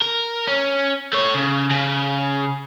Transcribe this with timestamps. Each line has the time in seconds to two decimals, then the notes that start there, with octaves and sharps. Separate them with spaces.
0.02 A#4
0.48 C#4
1.13 A3 C#5
1.34 C#3
1.70 C#3